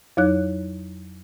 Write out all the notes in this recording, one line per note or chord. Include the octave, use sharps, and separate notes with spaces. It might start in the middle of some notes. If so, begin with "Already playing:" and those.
F2 F#3 D#4 C#5 F#6